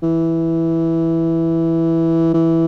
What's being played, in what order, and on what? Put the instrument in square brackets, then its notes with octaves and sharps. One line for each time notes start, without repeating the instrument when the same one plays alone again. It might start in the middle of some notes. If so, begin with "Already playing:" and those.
[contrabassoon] E3
E3